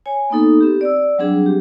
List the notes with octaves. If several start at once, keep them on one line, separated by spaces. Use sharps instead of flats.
C#5 G#5
A#3 B3 D#4 A4
C4 G4
D5 E6
F#3 G3 C4 D4 G#4
G4